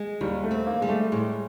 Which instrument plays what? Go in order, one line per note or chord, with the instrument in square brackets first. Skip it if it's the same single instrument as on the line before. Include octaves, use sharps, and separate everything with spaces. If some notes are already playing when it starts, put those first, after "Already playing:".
Already playing: [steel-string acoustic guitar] G#3
[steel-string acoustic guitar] D#2 [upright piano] G3
[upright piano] A3
[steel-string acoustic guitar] C4
[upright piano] A#3
[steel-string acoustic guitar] G3 [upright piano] G#3
[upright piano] A3
[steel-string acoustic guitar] A2 [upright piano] G#3